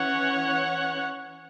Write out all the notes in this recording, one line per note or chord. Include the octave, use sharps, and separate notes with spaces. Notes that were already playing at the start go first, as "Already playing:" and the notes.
Already playing: E3 C#4 C#5 F#5